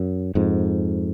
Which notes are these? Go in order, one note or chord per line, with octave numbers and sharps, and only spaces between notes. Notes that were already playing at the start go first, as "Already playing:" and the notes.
Already playing: F#2
F2 G#2